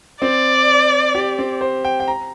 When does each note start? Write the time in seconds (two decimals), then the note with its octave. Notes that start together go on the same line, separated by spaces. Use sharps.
0.22 C4 D5
1.15 G4
1.39 C4
1.61 C5
1.85 G5
2.00 G5
2.08 A#5